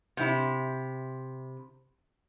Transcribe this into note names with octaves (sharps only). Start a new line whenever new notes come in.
C3 E4